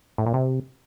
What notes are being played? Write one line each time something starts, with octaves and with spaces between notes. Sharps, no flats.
A2
A#2
C3